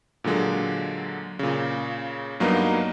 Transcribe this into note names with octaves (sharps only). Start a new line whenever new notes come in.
A#2 D3 F#3 G#3
A#2 C#3
G2 F#3 A#3 B3 D#4